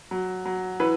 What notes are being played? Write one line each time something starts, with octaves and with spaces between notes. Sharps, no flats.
F#3
F#3
E3 B4